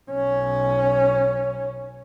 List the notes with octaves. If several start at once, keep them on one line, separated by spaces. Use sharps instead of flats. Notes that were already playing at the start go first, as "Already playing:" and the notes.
B1 C#4